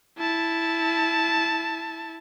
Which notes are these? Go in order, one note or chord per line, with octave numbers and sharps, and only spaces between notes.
E4 A5